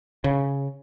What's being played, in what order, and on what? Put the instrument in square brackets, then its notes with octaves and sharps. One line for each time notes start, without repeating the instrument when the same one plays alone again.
[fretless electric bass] C#3